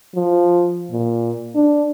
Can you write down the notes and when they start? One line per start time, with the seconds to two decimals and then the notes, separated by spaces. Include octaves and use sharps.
0.15 F3
0.92 A#2
1.55 D4